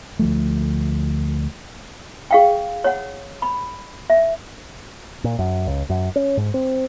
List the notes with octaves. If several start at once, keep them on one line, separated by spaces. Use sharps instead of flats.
D2 F3 A3
G#4 F5 G5
C#5 F#5
B5
E5
A#2
F#2
C#2
F#2
C#4
G#2
C4